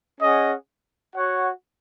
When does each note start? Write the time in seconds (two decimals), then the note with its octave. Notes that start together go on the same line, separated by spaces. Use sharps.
0.20 C#4 G#4 D#5 F#5
1.15 F#4 C#5 F#5